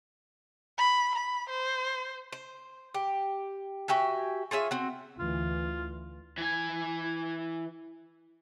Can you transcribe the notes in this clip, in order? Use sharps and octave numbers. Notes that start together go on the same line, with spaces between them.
B5
B5
C5
C5
G4
F#4 G4 E5 G#5
F4 G#4 C#5 E5
C4 F#4
D2 E3 F4
E3 G#5